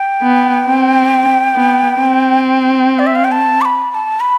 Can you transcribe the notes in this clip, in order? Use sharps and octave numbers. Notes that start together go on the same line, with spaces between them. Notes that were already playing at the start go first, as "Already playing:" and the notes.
Already playing: G5
B3
C4
B3
C4
D5
E5
F5
G5
A5
D6
B5
B5
A5
B5